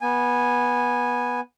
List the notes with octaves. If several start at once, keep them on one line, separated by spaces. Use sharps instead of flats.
B3 G#5